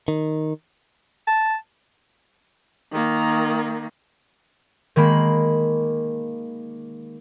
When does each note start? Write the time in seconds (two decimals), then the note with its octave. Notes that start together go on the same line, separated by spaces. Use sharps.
0.08 D#3
1.28 A5
2.92 D#3 A#3
4.96 D#3 G#3 A#3 B5